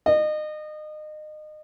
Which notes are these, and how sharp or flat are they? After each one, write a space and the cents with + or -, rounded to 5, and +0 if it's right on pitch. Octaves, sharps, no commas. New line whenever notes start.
D#5 -30